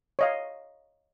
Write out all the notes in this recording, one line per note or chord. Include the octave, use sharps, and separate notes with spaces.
C#5 D#5 F5